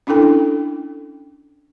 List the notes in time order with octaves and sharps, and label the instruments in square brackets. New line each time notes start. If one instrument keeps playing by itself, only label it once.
[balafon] C#4 D4 E4 A4 G5